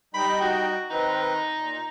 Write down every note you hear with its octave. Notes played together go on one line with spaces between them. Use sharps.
G3 D#4 G5 B5
F#4
D#3 C4 D#4 B4
A#2